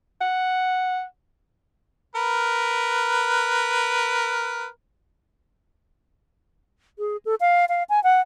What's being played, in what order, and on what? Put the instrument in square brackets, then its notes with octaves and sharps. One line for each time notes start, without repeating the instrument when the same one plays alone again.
[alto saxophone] F#5
[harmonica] A#4 B4
[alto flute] G#4
A4
F5
F5
G#5
F#5